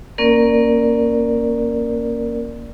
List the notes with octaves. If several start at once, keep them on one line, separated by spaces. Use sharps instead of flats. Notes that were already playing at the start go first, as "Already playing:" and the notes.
A#3 C#4 A#4 D5